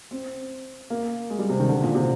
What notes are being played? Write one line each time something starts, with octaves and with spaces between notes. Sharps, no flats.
C4
A#3
G#3
G3
C3
D#3
D3
A#2
C3